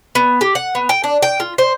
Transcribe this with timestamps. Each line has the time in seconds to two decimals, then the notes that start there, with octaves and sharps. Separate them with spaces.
0.15 B3
0.41 G4
0.55 F#5
0.75 B3
0.89 G5
1.04 D4
1.22 G5
1.40 F4
1.58 C5